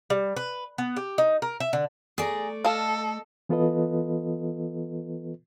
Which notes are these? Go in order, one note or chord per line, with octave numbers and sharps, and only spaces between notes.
G3
B4
B3
G4
D#4
A#4
E5
D3
A3 G#4 D5 A#5
A4 D#5 F5 A5
E3 B3 F4 A4 B4 D#5